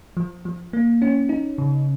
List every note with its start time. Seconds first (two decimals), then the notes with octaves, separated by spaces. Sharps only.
0.17 F3
0.45 F3
0.73 A#3
1.02 C#4
1.29 D#4
1.58 C#3